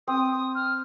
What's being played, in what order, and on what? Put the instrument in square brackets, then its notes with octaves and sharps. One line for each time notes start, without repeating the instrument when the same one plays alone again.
[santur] C4 [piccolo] D#6
[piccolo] D#6
F6